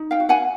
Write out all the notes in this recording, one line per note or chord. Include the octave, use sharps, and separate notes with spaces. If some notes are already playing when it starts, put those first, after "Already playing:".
Already playing: D#4
F5 G5
F#4
F#5 G#5